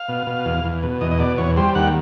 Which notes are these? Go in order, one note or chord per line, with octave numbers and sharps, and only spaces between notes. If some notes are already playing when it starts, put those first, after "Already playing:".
Already playing: F5
B2
B2
E2
E2
B2
E2 D#5
D#5
B2 D5
E2 C#5
G3 C5
D#2 F#5